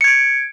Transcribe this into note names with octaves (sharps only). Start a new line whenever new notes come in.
G#6 C#7 D7